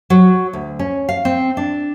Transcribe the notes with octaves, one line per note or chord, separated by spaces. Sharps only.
F#3
D2
C#4
F5
C4
D4